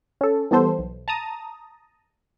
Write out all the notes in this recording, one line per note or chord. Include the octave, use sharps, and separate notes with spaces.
C#4 A4
E3 G3 B3 A4 C5
B1
A5 A#5 D#6